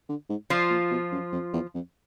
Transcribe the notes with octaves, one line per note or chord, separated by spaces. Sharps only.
D3
G#2
F3 F4
A#2
B2
F#2
F2
E2
F2